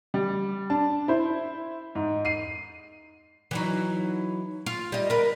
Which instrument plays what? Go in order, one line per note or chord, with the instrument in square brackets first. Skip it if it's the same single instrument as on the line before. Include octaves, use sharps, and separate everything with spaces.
[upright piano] G3
D4 A5
E4 C5
G#2
C7 D#7
[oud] E3 F#3 D#4
F4
G3 D#5
A#4 B4